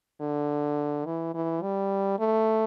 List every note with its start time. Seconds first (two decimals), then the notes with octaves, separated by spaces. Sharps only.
0.20 D3
1.05 E3
1.34 E3
1.62 G3
2.19 A3